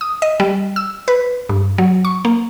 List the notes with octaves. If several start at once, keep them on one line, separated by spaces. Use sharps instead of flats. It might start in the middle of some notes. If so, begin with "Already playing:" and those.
D#6
D#5
G3
E6
B4
G2
F#3
C#6
A#3